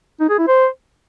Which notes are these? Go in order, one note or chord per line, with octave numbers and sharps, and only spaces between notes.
D#4
G#4
E4
C5